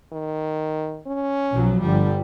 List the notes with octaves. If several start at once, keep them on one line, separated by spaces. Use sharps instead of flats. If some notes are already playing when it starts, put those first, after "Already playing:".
D#3
C#4
B1 F3 F#3
G1 D3 G3